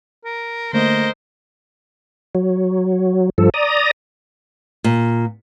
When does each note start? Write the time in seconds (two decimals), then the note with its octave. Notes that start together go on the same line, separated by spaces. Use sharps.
0.24 A#4
0.73 D3 A3 A#3 A#4 C5 D#5
2.35 F#3
3.38 G2 F3 A4
3.54 D5 A#5 D#6
4.84 A#2